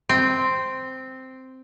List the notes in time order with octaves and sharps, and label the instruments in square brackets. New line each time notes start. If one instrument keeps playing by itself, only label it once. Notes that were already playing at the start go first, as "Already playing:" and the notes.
[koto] C4